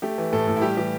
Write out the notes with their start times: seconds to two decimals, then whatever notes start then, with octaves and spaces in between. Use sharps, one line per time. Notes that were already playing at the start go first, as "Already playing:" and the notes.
0.02 A3 G4
0.18 E3
0.33 A2 A4
0.48 A2
0.56 E4
0.62 G3 G4
0.77 E3 G4